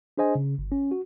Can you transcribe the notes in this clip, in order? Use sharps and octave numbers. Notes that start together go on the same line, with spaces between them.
D4 G#4 C5 D#5 G#5
C#3
G1
C#4
F#4